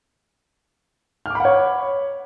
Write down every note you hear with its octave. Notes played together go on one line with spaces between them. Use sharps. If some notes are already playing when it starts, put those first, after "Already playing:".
C#5 F#5 B5 D6 F6